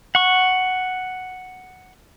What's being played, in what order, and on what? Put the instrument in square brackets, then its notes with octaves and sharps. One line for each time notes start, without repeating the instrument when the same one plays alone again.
[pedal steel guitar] F#5 C#6